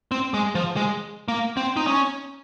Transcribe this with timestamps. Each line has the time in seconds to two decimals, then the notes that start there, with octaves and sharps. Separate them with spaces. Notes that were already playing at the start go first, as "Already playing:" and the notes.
0.12 C4
0.34 G#3
0.55 F3
0.76 G#3
1.28 A#3
1.57 C4
1.77 D#4
1.87 C#4